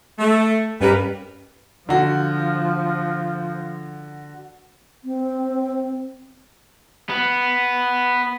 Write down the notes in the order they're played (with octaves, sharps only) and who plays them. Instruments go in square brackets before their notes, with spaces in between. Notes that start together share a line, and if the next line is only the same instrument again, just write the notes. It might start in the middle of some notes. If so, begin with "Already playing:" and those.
[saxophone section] A3
[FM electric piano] G2 C#4 G4 [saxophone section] G3 A#4 B4
[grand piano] D3 F#4 [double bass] F3
[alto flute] C4
[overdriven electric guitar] B3